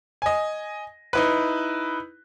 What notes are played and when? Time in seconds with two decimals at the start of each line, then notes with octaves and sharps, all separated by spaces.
0.22 D#5 G#5
1.13 D#4 E4 B4